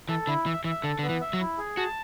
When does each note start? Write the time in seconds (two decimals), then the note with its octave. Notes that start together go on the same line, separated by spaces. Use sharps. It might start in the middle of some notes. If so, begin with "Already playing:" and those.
0.09 E3 A4
0.27 D3 E4
0.46 E3 E5
0.64 E3 E5
0.83 D3 A4
0.99 D3 B3
1.09 E3
1.21 E5
1.33 F#3
1.40 E4
1.58 G#4
1.77 F#4 A5